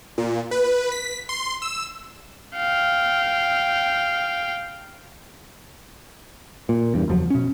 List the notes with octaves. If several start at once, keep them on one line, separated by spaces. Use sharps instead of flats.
A#2
B4
B6
C6
E6
F5 G5
A#2
E2 G2
F#1 E2 F3 F#3
B2 C#4